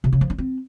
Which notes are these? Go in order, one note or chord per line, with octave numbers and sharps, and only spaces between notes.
C3
C#3
F3
D4
C4